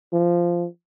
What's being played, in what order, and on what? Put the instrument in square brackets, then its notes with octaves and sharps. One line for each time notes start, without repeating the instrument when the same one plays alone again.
[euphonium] F3